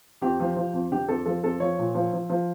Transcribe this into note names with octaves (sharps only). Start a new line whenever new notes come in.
F2 G4
F3
F3
F2
D3 G4
F2 A4
F3 A4
F2 A4
F3 C#5
A#2
F3
F3
F3